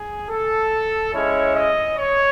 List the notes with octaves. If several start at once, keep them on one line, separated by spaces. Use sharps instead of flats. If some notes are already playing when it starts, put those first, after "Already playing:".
Already playing: G#4
A4
G#3 C#4 E4 C#5
D#5
C#5